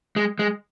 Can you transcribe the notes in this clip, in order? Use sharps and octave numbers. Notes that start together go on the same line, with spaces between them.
G#3
G#3